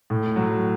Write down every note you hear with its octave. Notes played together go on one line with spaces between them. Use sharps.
A2
F#3